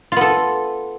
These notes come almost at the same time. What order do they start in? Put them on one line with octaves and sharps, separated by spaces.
F4 B3 A4